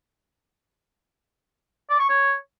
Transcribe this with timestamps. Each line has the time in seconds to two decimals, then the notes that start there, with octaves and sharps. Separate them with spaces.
1.90 D5
2.00 C#6
2.09 C#5